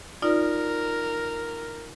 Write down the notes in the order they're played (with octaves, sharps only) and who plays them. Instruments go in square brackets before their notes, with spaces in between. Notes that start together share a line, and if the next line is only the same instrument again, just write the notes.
[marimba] D#4 F4 D5 [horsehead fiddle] A#4